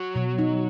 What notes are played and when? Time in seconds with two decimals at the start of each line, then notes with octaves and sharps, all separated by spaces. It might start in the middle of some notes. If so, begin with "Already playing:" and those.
Already playing: F#3 F#4
0.15 B2
0.39 D#4